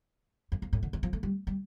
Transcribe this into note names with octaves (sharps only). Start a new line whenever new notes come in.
F2
F2
A2
D3
E3
F3
A3
G3
G3